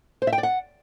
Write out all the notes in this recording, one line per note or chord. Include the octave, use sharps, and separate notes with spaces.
C5
E5
G5
D5
F#5